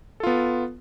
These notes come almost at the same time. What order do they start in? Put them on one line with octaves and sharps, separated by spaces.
A4 F4 B3